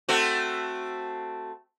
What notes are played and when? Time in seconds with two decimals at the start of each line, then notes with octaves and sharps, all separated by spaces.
0.09 A3 C4 F#4